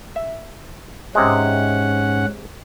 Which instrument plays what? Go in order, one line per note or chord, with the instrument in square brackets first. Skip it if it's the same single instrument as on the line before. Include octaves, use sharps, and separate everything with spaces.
[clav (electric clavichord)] E5
[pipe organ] G#2 C#4 F#5 [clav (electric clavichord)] C3 G#3